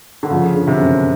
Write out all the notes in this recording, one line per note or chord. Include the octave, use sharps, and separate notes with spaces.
D3
C#3 F3
D3
C3
F#2